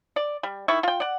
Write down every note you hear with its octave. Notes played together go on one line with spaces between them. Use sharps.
D5
G3
D#3 E4 C#6
F4 G5
D5 F#5